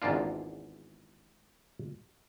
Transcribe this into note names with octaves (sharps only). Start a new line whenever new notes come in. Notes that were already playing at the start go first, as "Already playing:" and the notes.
G#1 E2 G#2 A#3 D4 F4